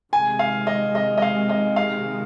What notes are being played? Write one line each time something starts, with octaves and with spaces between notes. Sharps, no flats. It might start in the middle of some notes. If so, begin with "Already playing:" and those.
C3 D#3 G#3 G#5
F5
D#5
D#5
D#5
F5
D#5
F5